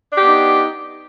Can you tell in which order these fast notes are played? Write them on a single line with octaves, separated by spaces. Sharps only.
D4 G4 B3 D#4